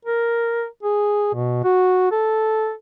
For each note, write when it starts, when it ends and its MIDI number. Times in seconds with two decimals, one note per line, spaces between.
0.05 0.66 70
0.83 1.33 68
1.34 1.63 47
1.64 2.10 66
2.12 2.73 69